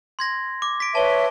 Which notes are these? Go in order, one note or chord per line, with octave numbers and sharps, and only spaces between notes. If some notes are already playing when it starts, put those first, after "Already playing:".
C6 G#6 A#6
D6
B6 D7
B4 C#5 E5 A5 G7